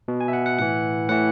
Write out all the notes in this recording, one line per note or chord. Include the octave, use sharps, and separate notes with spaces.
B2
G#5
E5
F#5
F#5
A2 E3 F#5
A2 E3 F#5